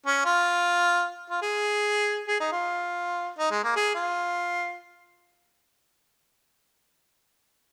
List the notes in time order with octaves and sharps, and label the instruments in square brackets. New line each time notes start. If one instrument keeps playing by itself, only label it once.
[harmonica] C#4
F4
F4
G#4
G#4
D#4
F4
D#4
G#3
A#3
G#4
F4